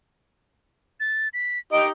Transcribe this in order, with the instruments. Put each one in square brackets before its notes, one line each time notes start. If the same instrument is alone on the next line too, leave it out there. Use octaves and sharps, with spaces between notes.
[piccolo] A6
B6
[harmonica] D#4 G4 D#5 [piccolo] D7